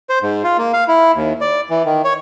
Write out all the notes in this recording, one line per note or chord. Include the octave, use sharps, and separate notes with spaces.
C5
G#2
F4
A#3
F5
E4
D#2
D5
E3
D#3
C#5